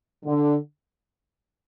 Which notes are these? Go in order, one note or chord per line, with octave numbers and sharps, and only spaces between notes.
D3